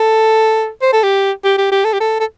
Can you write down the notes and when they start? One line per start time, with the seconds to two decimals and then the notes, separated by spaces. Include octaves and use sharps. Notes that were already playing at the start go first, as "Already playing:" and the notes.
Already playing: A4
0.82 C5
0.93 A4
1.03 G4
1.44 G4
1.58 G4
1.71 G4
1.84 A4
1.93 G4
2.00 A4
2.20 A4